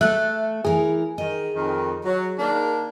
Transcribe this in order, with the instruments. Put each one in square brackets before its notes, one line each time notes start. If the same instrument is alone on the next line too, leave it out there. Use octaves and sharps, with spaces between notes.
[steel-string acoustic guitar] A3 A4 [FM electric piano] E5 F#6
[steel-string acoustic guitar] E3 A#4 [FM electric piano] G#4
[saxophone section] D#3 [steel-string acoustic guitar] D#5
[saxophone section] F2 D#3
F#3
D#3 A#3 D4